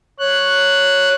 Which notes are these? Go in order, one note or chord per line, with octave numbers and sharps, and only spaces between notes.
C#5 F#6